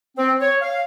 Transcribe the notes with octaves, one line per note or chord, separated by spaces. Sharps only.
C4
C#5
F5